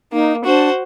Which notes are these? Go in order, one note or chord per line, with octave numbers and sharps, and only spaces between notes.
A#3 D#4
D4 F#4 C5